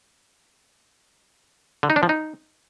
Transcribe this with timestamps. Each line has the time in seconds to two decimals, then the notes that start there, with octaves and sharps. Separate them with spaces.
1.83 D3
1.90 D#4
1.96 D4
2.03 F3
2.09 D#4